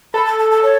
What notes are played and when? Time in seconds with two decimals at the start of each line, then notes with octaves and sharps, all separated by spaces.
0.14 A4 B5
0.26 A5
0.39 A5
0.51 A5
0.62 C#5